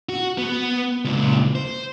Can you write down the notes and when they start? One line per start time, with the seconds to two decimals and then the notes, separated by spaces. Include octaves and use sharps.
0.09 F#4
0.38 B3
1.05 C#2 A#2
1.55 C5